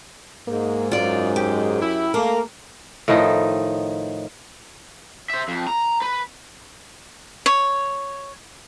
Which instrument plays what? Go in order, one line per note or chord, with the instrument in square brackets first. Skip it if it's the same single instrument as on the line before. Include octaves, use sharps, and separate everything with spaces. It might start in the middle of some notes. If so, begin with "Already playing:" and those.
[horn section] G#2 [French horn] A#3
[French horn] F#2 [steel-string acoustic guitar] F4 D5
[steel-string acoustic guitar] G4
[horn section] E4
[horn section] A3 A#3 [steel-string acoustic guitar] A#4
[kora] A2 D#3 F3 D#4
[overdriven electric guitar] C5 E5
F2
A#5
B4
[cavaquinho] C#5